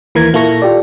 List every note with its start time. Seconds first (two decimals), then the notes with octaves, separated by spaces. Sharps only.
0.15 D#2 E3 A#3 A#4 A#5 G#6
0.33 A#2 A#3 E4 A4 C#6 A#6
0.62 F4 G4 A4 D5